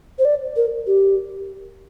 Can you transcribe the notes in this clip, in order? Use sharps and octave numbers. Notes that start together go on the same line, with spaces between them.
C5
D5
A#4
G4